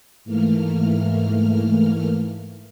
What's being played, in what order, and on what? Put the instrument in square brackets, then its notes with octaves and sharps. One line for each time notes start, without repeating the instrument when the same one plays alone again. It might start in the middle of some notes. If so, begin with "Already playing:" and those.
[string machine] G#2 E3 A3 A#3 F6